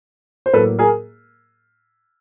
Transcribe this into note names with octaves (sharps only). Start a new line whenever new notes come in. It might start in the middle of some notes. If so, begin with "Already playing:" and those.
C5
A2 F#3 A#3 A4 B4
G#4 A#4